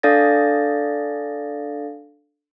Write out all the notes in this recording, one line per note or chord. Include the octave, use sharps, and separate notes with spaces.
D4 A4 D5 F5 A6 A#6